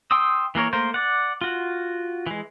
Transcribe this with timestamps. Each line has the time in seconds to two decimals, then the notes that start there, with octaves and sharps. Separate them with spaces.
0.11 G5 C6 D#6 E6
0.55 E3 A#3 A#4 C#5
0.73 A3 A#3 A#4 C5
0.94 D5 F#5
1.41 F4 F#4
2.27 E3 G#3